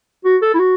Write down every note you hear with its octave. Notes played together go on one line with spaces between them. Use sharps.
F#4
A4
E4
F#4